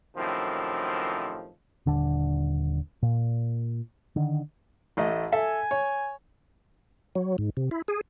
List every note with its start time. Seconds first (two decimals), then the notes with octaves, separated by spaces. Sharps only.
0.16 F#2 A2 C3 D#3 F3
1.86 D#1 D3 D4
3.02 A#2
4.16 D3 D#3
4.97 A1 A3 D#5
5.32 A4 E5 G#5
5.71 C#5
7.15 F#3
7.38 G#2
7.57 C3
7.71 E4
7.88 G#4